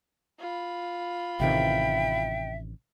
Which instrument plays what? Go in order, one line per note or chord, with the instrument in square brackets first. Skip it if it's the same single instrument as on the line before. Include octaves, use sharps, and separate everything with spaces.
[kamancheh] F4 B5
[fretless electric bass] A1 C3 D#3 [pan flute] E5 [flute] G5